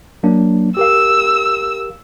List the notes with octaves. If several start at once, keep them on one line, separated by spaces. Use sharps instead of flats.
F#3 A#3 D4
G4 A#4 F5 E6